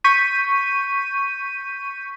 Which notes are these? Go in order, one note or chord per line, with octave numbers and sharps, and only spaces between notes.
C#6 G6 B6 D#7